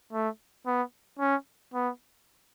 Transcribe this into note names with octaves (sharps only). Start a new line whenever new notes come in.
A3
B3
C#4
B3